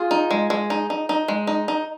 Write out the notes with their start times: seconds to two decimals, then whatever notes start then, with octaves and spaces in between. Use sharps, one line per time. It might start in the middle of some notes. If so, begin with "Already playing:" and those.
Already playing: F4 G#4
0.11 D#4
0.31 G#3
0.50 G#3
0.70 D#4
0.90 D#4
1.09 D#4
1.28 G#3
1.47 D#4
1.68 D#4